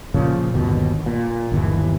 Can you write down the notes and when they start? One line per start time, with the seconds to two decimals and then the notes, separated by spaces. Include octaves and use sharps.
0.14 A#2 C#3 F3
0.54 G1 D#2 B2
1.06 A#2
1.52 G1 D#2 E3